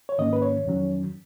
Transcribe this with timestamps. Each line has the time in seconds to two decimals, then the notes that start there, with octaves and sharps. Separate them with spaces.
0.09 C#5
0.18 G#2 D#3 A#3 C#4 D#5
0.33 B4
0.42 C#5
0.65 F2 D#3 F#3 C#4